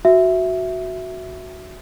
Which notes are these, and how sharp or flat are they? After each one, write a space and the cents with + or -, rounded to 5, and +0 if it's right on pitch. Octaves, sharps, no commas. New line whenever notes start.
F#4 +0 E5 +0